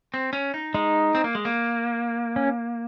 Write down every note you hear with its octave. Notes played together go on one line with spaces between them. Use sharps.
C4
C#4
D#4
G#3 D#4
C4
A#3
G#3
A#3
C#4